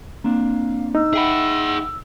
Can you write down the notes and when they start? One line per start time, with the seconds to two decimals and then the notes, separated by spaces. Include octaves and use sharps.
0.24 A#3 C4 D4 F5
0.95 D#4 E6
1.13 G#4 E5 F#5 G5 B5